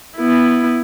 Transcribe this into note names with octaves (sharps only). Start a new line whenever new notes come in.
B3 E4